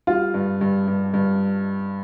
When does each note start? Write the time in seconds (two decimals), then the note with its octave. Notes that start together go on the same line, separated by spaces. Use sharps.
0.07 G3 F4
0.34 G2
0.61 G2
0.88 G2
1.14 G2